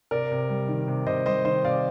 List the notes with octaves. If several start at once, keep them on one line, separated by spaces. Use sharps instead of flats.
C3 A#4 D5
C3
G3
D#3
C3
C3 C5 D#5
G3 C5 D#5
D#3 C5 D#5
C3 D5 F5